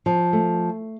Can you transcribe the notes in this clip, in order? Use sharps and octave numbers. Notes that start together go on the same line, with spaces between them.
F3
A3